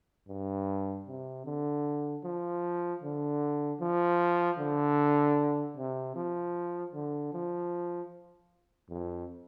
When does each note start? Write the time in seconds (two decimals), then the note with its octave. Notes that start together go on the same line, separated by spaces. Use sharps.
0.28 G2
1.07 C3
1.45 D3
2.24 F3
3.02 D3
3.81 F3
4.59 D3
5.77 C3
6.15 F3
6.94 D3
7.33 F3
8.90 F2